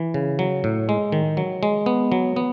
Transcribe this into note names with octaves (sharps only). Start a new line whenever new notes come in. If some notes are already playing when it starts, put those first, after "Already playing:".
Already playing: E3
C#3
F#3
A2
G#3
D#3
F#3
G#3
B3
F#3
B3